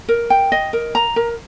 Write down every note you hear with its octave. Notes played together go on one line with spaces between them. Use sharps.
A#4
G5
D#5
A#4
A#5
A#4